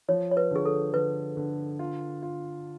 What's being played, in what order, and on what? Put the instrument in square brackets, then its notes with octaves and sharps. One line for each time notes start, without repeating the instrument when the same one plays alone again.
[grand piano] F3 [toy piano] C#5
[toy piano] C#5
B4
[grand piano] D3 [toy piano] G#4
[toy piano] A4
[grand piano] D3 [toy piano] B4
[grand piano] D3
F4
F4